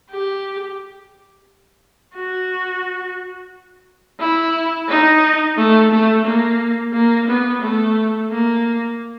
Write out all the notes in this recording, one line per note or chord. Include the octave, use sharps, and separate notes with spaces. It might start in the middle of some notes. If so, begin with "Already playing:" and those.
G4
F#4
E4
D#4
A3
A3
A#3
A#3
B3
A3
A#3